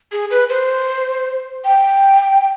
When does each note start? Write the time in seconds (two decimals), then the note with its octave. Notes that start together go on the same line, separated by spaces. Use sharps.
0.12 G#4
0.31 B4
0.50 C5
1.64 G5